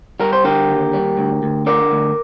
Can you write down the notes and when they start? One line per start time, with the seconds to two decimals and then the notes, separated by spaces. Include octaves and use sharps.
0.20 G3 A#4
0.33 C5
0.44 D3 G4 A#4
0.69 D#2
0.93 G3
1.18 D2
1.43 D2
1.66 D3 A#4 D5
1.92 D2